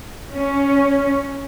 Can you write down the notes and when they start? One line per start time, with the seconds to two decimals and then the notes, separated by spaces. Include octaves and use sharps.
0.35 C#4